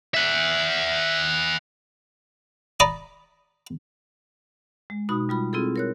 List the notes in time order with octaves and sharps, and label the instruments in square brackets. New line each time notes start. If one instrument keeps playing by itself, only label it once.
[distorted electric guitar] E5 F#5
[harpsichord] D5 A#5 B5 D#6
[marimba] G#3
B2 D#4 F#4 B5 D#6
G3 F4 B5
C4 E4 F4 G#4 A4
A#4 C#5 F#6